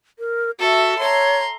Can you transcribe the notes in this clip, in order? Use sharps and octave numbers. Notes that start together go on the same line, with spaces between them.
A#4
F#4 A4 E5
C#5 A#5 C6